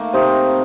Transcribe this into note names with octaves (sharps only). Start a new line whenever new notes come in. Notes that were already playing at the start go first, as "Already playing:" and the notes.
Already playing: D#3 A3 A#3
C3 C4 D#4